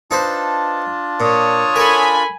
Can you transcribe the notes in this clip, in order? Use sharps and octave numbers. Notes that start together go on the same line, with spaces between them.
D4 D#4 F4 B4 C5 A5
A#2 C#5 D#6
A4 A#4 G#5 B5